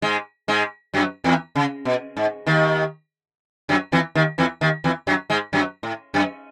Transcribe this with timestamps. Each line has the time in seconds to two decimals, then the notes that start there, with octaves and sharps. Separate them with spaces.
0.02 G#2 G#3
0.48 G#2 G#3
0.94 F#2 F#3
1.24 E2 E3
1.55 C#3
1.85 B2
2.17 G#2
2.47 D#2 D#3
3.69 F#2 F#3
3.92 E2 E3
4.15 D#2 D#3
4.38 E2 E3
4.61 D#2 D#3
4.84 E2 E3
5.07 F#2 F#3
5.30 G#2 G#3
5.53 F#2 F#3
5.83 A2
6.14 F#2